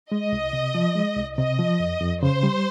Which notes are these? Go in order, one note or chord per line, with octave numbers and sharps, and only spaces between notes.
G#3 D#5
C2
C3
F3
G#3
C2
C3 D#5
F3
F2
F2
C#3 C5
G3